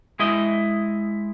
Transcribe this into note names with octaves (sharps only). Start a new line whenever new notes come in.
G#3 E4 D#5